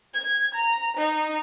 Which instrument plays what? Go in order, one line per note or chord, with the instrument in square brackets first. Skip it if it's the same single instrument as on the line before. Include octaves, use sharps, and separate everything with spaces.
[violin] G#6
A#5
D#4